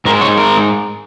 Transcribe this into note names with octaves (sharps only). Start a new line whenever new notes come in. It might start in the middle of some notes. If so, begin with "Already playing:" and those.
G#2 G#3 A#4
C#5
A#4